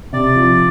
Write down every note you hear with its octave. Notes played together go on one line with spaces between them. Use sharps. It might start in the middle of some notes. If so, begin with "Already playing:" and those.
C3 D5
F3